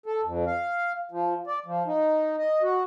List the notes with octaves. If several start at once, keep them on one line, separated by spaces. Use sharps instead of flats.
A4
F2
F5
F3
D5
F3
D#4
D#5
F#4